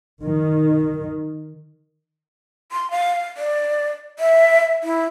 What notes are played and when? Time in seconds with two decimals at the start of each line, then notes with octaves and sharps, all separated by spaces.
0.22 D#3
2.72 C6
2.91 F5
3.37 D5
4.19 E5
4.83 E4